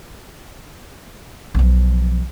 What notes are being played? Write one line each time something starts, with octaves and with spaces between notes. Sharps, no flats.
B1 F3